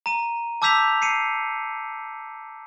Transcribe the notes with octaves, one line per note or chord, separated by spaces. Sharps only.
A#5 D#7
A5 D6 E6 G6 B6 F7
C7 C#7 D#7